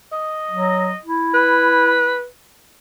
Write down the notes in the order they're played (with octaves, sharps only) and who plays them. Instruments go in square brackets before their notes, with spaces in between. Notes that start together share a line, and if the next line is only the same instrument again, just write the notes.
[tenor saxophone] D#5
[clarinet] F#3
E4
[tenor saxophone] B4